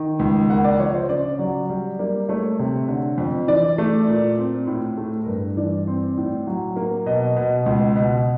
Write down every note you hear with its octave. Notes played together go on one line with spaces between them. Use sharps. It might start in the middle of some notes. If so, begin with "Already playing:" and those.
Already playing: D#3
C#2
A#3 F#5
D5
F3 C#5
C5
C#3 D5
F#3 D5
G3
A#3 D5
A3 C#5
C3
D3
F2
E3 D5
A3
A#2
C4
A2
A3
A#4
G2 B4
E3 D5
C4
A2
F#3
A#3
B2 D#5
B2
C#2
B2